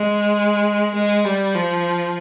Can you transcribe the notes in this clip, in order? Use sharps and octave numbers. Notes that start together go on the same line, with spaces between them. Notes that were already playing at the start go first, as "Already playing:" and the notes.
Already playing: G#3
G#3
G3
F3